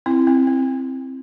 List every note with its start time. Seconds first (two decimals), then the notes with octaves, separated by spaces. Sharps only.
0.06 C4 E4
0.27 C4
0.47 C4